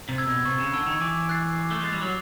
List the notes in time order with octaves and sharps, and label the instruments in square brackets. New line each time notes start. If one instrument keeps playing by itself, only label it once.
[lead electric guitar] C3
[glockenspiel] E6 G#6
[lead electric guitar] B2
[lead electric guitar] C3 [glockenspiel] C#6
[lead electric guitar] C#3
[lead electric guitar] D3 [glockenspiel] E6 G#6
[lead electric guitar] D#3
[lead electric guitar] E3 [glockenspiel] D6
[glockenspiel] F#6 A6 C7
D6
[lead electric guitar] A3
[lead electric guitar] G#3 [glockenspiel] F#6 A6 C7
[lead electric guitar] G3
F#3